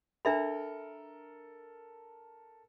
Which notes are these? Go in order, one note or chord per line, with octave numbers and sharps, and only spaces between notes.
D4 A4 A#4 E5 B5